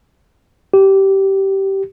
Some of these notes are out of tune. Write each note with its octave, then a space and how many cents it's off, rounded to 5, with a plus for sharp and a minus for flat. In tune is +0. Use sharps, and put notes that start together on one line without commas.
G4 -15